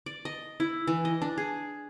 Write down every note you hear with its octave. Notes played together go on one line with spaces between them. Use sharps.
D5
D#5
E4
E3
D#5
D4
G#4